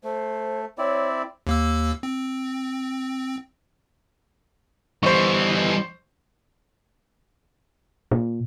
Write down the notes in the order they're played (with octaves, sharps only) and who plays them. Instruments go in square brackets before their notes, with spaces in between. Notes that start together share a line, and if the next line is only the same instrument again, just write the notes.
[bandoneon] A3 [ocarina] C5
[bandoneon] C4 E4 D5 [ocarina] C#5
[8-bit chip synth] D#2 A#3 E6
C4
[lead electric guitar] E3 [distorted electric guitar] G3 B3 [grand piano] C5 C#6 [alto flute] D#5
[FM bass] A#2